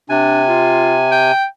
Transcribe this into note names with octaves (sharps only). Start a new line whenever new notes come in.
C3 D4 G#5
F4
G5